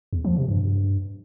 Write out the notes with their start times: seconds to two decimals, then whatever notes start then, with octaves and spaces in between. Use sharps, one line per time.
0.13 E2
0.25 F3
0.36 C3
0.48 G2